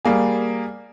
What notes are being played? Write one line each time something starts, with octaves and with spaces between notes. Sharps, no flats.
G3 A#3 G#4